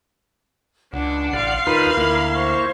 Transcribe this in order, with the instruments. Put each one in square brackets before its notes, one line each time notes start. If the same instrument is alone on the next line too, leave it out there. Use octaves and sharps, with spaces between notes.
[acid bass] C#2 [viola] D4 [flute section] F#5
[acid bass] A1 [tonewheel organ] D5 [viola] F5 C6
[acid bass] D#2 [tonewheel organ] D#4 F4 B4 [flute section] A#4 B5 F6
[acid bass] D2 [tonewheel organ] A#3 E4
[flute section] C5 C#6